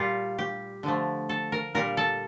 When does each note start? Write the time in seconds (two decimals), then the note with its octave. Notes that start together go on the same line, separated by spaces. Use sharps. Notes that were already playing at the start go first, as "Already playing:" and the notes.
Already playing: A#2 G3 F4 G4
0.38 G4
0.83 D3 F3 A3
1.29 A4
1.52 A#4
1.75 A#2 G3 A#4
1.97 A4